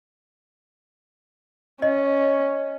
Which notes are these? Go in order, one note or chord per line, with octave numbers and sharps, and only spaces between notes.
C#4 D#5